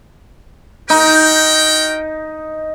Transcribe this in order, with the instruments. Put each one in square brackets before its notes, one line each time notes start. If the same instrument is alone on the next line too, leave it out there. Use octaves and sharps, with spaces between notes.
[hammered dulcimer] D#4 [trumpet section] F#4 A#4 G5